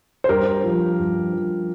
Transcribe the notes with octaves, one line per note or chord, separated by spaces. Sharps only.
C5
G2 G4 A#4
F3
G2
F3